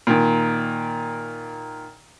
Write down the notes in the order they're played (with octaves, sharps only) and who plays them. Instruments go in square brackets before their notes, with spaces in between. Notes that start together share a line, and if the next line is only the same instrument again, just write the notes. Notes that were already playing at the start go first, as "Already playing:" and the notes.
[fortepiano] A#2 D#3